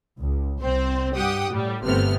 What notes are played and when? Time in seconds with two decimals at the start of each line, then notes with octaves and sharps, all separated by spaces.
0.18 C#2
0.62 C2 C4 C5
1.15 G2 G4 F#5 G5 D#6
1.51 A2 G3
1.84 G1 C3 A3 B3 F6